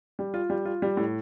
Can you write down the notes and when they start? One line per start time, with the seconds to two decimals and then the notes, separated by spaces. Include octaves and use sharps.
0.19 G3
0.34 F4
0.50 G3
0.65 F4
0.82 G3
0.97 A2